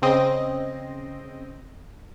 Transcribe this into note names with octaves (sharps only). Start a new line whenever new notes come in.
C#3 C4 D#5